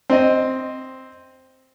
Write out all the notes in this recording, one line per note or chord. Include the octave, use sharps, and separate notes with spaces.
C4 D#5